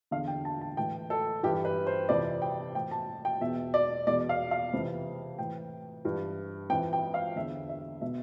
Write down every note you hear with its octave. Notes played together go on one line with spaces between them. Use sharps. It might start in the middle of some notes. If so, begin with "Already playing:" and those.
E2 D3 F5
G5
A5
A5
A2 E3 G5
A4
G2 E3 G4
B4
C5
F2 C3 E3 D5
G5
A2 E3 G5
A5
G5
E2 B2 E5
D5
E2 B2 D5
F5
F5
F2 C3 E3
A2 E3 G5
G2 E3
F2 E3 G5
G5
F5
E2 D3 E5
E5
B2 E5